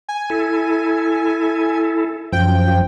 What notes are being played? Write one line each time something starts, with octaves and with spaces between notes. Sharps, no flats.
G#5
E4 A4
F#2 F3 G5